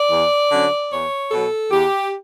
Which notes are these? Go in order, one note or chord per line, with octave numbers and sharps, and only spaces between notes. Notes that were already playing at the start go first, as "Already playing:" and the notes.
Already playing: D5
E2
D3 F#3 C#4
E2 C#5
B2 F#3 A4
E2 G4